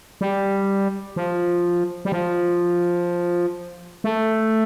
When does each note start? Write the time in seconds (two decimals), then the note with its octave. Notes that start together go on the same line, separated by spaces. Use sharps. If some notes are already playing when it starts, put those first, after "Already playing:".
0.21 G3
1.16 F3
2.05 G3
2.12 F3
4.04 A3